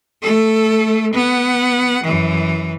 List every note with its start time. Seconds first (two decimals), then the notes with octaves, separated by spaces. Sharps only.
0.22 A3 A4
1.14 B3 F#5
2.04 F#2 E3